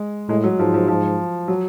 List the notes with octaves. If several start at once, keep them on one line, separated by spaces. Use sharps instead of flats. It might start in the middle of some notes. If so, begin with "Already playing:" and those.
Already playing: G#3
A2 G#3
F#3
G#2 F3
F3
F3
F#3